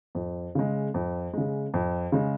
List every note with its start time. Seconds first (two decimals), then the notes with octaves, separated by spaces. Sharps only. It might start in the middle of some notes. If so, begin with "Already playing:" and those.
0.15 F2
0.55 C#3 G#3
0.94 F2
1.34 C#3 G#3
1.74 F2
2.12 C#3 G#3